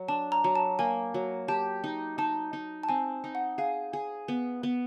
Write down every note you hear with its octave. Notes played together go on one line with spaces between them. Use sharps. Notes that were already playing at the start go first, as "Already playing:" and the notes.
Already playing: F#3
D4 A5
A#5
F#3 A#5
A5
A#3 G#5
F#3
G4 A5
D#4
D#4 A5
D#4
A5
C4 G#5
D#4
F#5
G#4 F5
G#4
B3
B3